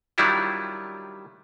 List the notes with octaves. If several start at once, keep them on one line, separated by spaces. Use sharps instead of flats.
D#3 F#3 G3 D4 E4 F4